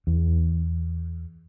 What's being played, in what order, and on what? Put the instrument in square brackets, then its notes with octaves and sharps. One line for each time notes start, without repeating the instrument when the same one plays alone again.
[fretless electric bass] E2